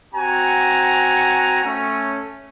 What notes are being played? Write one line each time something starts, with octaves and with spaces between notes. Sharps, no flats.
C4 F#4 G#5 A#5
A3 C#4